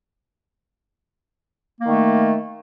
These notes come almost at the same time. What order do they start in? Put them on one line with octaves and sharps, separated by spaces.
A#3 D#3 A3